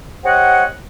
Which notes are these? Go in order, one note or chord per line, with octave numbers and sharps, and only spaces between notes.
G4 C5 C#5 D#5 F#5